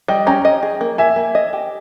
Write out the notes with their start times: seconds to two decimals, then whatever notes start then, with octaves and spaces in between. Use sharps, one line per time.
0.08 G3 D#5 G5
0.26 C#4 G5 A#5
0.45 D#5
0.63 G#4
0.81 A#3
0.98 A#3 E5 G#5
1.16 A#3
1.35 D#5
1.53 G4